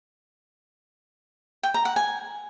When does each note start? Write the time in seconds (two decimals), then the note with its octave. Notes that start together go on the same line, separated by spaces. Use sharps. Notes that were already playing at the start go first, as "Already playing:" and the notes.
1.63 G5
1.74 A#5
1.85 F#5
1.96 G#5